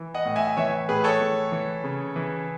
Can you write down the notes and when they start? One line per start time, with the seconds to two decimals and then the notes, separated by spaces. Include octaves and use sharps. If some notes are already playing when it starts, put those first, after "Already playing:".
Already playing: E3
0.14 D#5 F#5
0.25 A2
0.36 E5 G#5
0.57 E3 C#5 E5
0.89 A2 G#4 B4
1.04 A4 C#5
1.21 E3
1.52 E3
1.84 C#3
2.16 E3